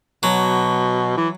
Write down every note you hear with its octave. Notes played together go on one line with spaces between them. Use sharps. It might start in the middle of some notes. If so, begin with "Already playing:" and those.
B2 F#3
E3